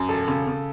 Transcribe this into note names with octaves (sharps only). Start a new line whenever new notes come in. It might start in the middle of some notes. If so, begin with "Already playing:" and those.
Already playing: F#2
E1 A4
C#3
C#3